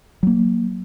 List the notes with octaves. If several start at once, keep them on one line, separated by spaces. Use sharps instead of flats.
F#3 A#3